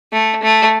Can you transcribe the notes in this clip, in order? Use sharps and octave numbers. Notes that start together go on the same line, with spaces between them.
A3
A3